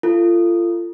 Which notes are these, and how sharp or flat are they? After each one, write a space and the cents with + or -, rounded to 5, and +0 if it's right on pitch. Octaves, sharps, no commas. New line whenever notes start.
F4 -25 A4 +25